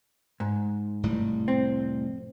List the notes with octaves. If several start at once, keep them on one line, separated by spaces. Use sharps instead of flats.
G#2
F1 A2 G3
C4